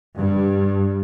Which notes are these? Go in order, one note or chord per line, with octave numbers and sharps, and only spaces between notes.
G2